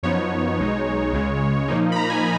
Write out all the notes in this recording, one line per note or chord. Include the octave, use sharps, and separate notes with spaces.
F#2 F3 B3 D#4 C#5
B1 B2 G#3 D#4
C#2 C#3 G#3
A#2 F3 A#3 D#4
B5
A#5
G#5